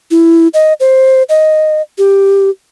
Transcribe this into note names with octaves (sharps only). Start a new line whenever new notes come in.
E4
D#5
C5
D#5
G4